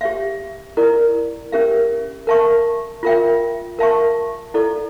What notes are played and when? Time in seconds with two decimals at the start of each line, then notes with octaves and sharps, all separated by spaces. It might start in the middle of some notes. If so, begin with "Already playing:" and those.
0.01 G4 C#5 E5
0.77 E4 A#4 D5
1.52 C#4 G4 A#4 E5
2.27 A#4 E5 A5 C#6
3.03 F4 A#4 E5 G5
3.79 A#4 E5 A5 C#6
4.54 E4 A4 D5